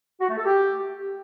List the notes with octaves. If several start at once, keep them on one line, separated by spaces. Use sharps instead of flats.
F#4
A3
A4
G4